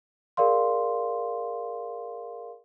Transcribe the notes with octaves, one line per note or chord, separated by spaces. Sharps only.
G#4 A#4 D5 F5 C6